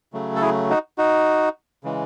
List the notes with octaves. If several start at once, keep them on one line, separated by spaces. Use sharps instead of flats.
C#3 F#3 A3
A4
E4 G#4
D#4 F#4
D#4 F#4
C#3 E3 G#3